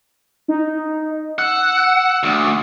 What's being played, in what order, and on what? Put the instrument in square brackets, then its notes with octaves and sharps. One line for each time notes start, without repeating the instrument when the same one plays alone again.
[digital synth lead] D#4
[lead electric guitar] F#5 [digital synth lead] E6
[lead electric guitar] D2